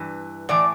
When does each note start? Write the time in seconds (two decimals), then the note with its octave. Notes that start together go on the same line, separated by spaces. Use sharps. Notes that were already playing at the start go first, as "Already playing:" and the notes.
Already playing: G2 E3
0.49 A2 E3 D5